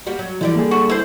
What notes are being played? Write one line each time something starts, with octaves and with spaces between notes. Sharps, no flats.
G3 A#3 F#4
F#3
D3 E3 F3 G3 E4 D5
A#3 G#4
F#4
E4 C5